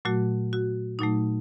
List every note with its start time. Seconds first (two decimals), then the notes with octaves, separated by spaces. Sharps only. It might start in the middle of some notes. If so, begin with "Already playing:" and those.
0.05 A#2 F#3 A3 F#4
0.53 F#4
0.99 A#2 F#3 A3 D#4